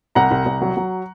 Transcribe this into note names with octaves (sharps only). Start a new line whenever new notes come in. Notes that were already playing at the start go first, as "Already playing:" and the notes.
C2 F#5 A#5
C2
C2
F#3
F#3